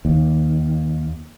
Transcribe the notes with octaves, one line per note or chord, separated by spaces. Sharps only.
D#2